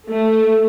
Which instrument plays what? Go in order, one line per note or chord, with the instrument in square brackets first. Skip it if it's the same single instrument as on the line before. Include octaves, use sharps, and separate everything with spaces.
[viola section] A3